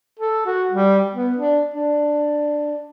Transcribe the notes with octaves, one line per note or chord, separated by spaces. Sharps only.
A4
F#4
G3
B3
D4
D4